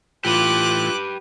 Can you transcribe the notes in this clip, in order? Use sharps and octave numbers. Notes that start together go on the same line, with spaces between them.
A2 E3 F4 G4 B4 D6 F#6